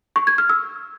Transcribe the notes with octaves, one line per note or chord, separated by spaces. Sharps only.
C#6
G#6
F6
E6